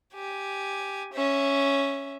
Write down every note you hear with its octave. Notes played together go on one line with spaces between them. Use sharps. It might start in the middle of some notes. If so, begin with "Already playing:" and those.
G4 G#5
C#4 E5